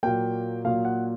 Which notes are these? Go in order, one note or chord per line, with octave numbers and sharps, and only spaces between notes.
A#2 F#3 A#3 G5
A#2 F#3 A#3 F5
F#5